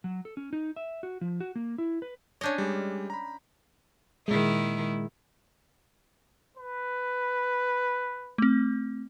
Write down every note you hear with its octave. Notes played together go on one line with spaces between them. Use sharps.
F#3
A4
C#4
D#4
E5
F#4
F3
F#4
A#3
E4
B4
C#4 D4 C#5 D#5 G6
G3 G#3
A#5 B5
A#2 D#3 G#3 E4
B4
A3 C4